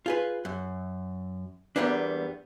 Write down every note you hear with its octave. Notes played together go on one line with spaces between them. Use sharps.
F4 G#4 B4
F#2
E2 E3 G3 A#3 B3 D4